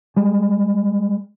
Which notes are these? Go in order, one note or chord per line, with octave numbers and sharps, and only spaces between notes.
G3 G#3